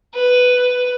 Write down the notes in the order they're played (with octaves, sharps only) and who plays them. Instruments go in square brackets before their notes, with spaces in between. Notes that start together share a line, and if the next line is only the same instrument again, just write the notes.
[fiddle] B4